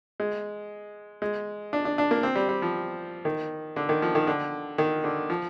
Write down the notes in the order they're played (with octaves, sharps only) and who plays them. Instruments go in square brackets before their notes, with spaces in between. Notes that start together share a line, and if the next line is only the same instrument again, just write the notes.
[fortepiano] G#3
G#3
D4
D4
D4
A#3
C4
G3
G3
F3
D#3
D3
D#3
F3
D#3
D3
D#3
D3
F3